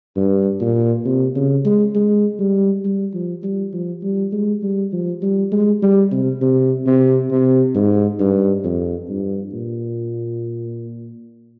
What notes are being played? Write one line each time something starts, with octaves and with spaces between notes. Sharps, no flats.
G2
A#2
C3
C#3
G#3
G#3
G3
G3
F3
G3
F3
G3
G#3
G3
F3
G3
G#3
G3
C3
C3
C3
C3
G#2
G2
F2
G2
A#2